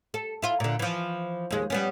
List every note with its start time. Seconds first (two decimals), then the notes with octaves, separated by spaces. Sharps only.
0.14 A4
0.42 E4 F4
0.60 A#2 D3
0.79 E3 F3
1.50 D#2 G#3
1.70 G3 B3 C#4